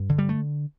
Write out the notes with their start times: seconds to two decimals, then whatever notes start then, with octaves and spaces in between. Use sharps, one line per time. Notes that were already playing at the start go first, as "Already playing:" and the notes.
Already playing: G2
0.09 D3
0.18 G3
0.29 A3